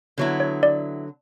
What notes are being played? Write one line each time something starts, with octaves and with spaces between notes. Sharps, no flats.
D3 F#3 B3 E4
C#5
D5